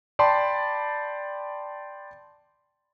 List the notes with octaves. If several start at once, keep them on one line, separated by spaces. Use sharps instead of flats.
D5 G5 A5 B5 C6